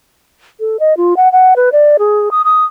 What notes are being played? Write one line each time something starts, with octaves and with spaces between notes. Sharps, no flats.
A4
D#5
F4
F#5
F#5
B4
D5
G#4
D#6
D#6